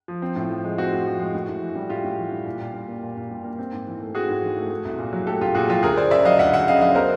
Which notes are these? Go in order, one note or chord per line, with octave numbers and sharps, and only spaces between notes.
F3
C4
A2
F3
G#3
C4 F#4
A2
F3
G#3
A2
A2
E3
G3
A2 F4 G4
A2
E3
G3
A#2
A#2
G3
A#3
A#2
A#2
G3
A#3
C4
G#2
E3
A3
C4 F#4 G#4
G#2
E3
A3
A3
C2
A#2
F#3
A3 G4 A4
C2 F4 G4
A#2 F#4 G#4
F#3 F4 G4
D2 G#4 A#4
D2 C5 D5
C#3 D5 E5
F#3 D#5 F5
D2 E5 F#5
D2 E5 F#5
C#3 D#5 F5
F#3 D#5 F5
B3 A#4 C5